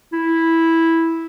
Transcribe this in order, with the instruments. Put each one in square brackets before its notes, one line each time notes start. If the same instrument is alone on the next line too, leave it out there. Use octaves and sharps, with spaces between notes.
[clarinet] E4